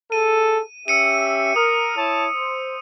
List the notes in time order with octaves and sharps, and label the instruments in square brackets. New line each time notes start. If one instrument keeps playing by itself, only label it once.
[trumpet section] G#4 A4 [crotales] D#7
[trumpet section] C#4 G4 E5 [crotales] E6 C#7 D#7
[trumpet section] A#4 [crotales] D#6
[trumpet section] E4 C#5 A5
C5